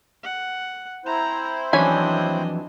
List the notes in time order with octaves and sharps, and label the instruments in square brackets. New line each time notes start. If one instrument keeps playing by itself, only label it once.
[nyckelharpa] F#5
[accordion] C4 E4 C5 [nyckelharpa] A#5
[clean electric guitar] F2 E3 F#3 [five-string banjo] C#4 G#5 B5 [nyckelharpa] D4 D#5